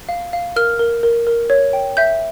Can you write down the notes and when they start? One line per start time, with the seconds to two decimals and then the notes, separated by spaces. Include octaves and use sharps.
0.09 F5
0.33 F5
0.56 A#4 F6
0.79 A#4
1.03 A#4
1.27 A#4
1.50 C#5
1.73 G5
1.97 E5 G6